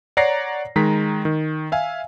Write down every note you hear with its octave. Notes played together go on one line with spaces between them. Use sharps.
C#5 D5 F#5 A#5 A#6 C7
D#3 G#3 A#5 B6
D#3
E5 F5 G#5